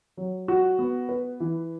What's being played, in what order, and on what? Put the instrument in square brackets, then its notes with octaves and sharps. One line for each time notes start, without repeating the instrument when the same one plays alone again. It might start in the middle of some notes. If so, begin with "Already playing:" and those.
[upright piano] F#3
F#4
B3
B4
E3